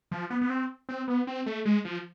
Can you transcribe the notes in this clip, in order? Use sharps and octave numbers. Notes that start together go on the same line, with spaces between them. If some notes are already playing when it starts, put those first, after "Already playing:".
F3
B3
B3
C4
C4
B3
C4
A3
G#3
F3